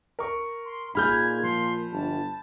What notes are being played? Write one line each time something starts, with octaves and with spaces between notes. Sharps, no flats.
A#4 C#6
C6
A#2 D#4 G#4 B5 F6 G6 G#6
F3 C6
G1 A5